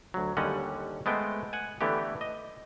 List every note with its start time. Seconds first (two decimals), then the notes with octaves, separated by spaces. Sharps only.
0.14 D2 F#3
0.37 D#2 D3 G3 C#4 D#5 F#5
1.06 G#3 A3 B3 C5 G5
1.53 F#5 G#5
1.81 D3 E3 A3 B3 G4
2.21 D#5